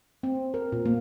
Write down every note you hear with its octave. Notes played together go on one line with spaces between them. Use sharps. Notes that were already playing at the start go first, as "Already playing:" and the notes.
C4
A#4
A#2
A#3